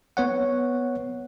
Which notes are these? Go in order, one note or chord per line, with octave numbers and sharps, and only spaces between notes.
B3 C#5 F#5